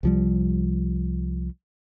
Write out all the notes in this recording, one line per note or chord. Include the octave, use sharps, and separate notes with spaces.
C2 F3 G3